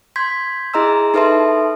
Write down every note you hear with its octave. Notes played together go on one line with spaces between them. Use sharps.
C6 G6 G#6 B6
E4 G#4 D#5 A#5 C6 E6
D#4 A4 B4 E5 A5 C6